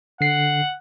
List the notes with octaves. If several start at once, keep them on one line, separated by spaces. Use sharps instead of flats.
D3 F#5 C7